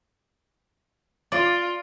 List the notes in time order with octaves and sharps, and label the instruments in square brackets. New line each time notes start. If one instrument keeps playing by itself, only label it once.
[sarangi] F4 [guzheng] D5